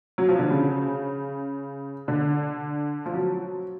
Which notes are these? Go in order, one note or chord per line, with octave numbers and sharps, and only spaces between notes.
F#3
F3
D3
C#3
D3
F3
F#3